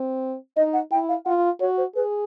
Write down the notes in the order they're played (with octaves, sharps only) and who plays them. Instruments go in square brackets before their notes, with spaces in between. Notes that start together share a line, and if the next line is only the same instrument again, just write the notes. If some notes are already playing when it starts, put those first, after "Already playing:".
Already playing: [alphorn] C4
[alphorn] D#4 [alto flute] D#5
[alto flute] F#5
[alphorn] E4 [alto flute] G5
[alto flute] F5
[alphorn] F4 [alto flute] F#5
[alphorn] F#4 [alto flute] C#5
[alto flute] C5
[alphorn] G#4 [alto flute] B4